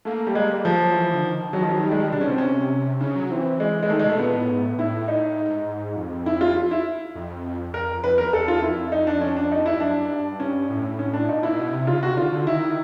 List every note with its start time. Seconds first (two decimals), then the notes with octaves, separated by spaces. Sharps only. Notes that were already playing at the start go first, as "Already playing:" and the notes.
0.05 A3 A#3
0.27 G3
0.35 G#3
0.50 G3
0.65 F3 A3
0.79 F#3
0.94 E3
1.13 D3
1.24 D#3
1.53 D#3 F#3
1.61 F3
1.69 F#3
1.83 G3
1.92 G#3
2.00 G3
2.12 B2 D4
2.21 C#4
2.27 B2 C4
2.38 C3 C#4
3.01 C#3 C#4
3.16 F#3
3.31 E3 C4
3.60 G#3
3.83 G#3
3.90 D#3 A3
3.99 G#3
4.04 B2 A3
4.19 A#2 B3
4.34 A2
4.49 G#2
4.63 A2
4.78 A2 E4
5.08 D#4
5.38 G#2
5.96 F2
6.26 E4
6.41 F4
6.56 F4
6.71 E4
7.15 F2
7.74 F2 A#4
8.04 F2 B4
8.18 E2 A#4
8.33 E2 A4
8.48 F4
8.62 F2 E4
8.92 D#4
9.07 D4
9.21 C#4
9.37 D4
9.52 D#4
9.66 E4
9.74 G2
9.80 F#2 D4
10.11 G2
10.40 C#4
10.70 A2
10.99 C#4
11.13 D4
11.28 A#2 D#4
11.43 A#2 E4
11.59 B2
11.72 C3
11.87 C#3 F4
12.03 C3 F#4
12.17 D3 F4
12.32 D3
12.46 D#3 E4